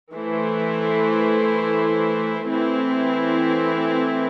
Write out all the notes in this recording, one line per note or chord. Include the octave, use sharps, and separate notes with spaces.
E3 A3 E4 C5
E3 A3 C4 E4